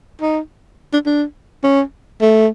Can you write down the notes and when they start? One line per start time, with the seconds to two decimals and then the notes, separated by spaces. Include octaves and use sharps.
0.21 D#4
0.93 D4
1.06 D4
1.64 C#4
2.21 A3